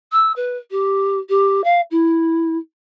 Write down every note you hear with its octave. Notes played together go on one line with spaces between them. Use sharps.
E6
B4
G4
G4
F5
E4